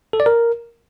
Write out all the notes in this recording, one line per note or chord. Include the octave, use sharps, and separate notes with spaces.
A4
D5
A#4